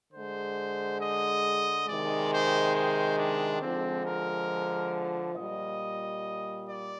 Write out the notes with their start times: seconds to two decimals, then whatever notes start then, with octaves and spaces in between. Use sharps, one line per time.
0.12 D3 C5
0.17 G#3
1.00 D#5
1.87 C3 D#3 G#3 D5
2.31 C5
2.75 C5
3.18 D4
3.61 D3 F3 G#3 C4
4.05 A#4
5.36 A#2 G3 D#5
6.66 D5